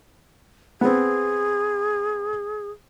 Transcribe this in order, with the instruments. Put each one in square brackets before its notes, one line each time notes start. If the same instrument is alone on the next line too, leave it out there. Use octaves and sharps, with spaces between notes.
[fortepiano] B3 C4 [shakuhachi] G#4